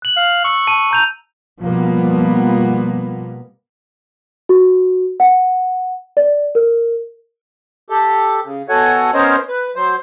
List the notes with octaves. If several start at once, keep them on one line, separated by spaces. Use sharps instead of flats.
F#6 F#7
F5
C#6 E6
A5 D#7
A#5 G6 F7
B2 F3 G3 A#3 B3
F#4
F#5
D5
A#4
G4 A4
C#3
B2 F#4 A4 C#5 F#5 G#5
B3 C#4 A#4 C5 C#5 D#5
B4
F#3 C5